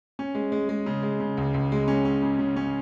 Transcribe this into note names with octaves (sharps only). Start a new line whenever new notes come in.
C#4
G#3
G#3
G#3
C#3
G#3
C#3
C#2
C#2
G#3
C#4
C#4
C#3
C#3
C#4